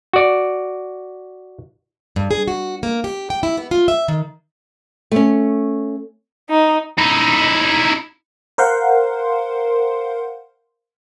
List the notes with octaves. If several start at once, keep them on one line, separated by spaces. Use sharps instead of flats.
F#4 D5
G2
G#4
F#4
A#3
G4
G5
E4
B3
F4
E5
D#3
A3 C#4
D#4
D#4 E4
A#4 C5 F5 F#5 C6